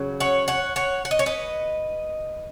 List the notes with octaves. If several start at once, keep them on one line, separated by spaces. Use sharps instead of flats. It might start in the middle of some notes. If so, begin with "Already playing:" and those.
Already playing: C#3 F#3
C#5 F#5
C#5 F#5
C#5 F#5
F#5
D#5
C#5
B4 D#5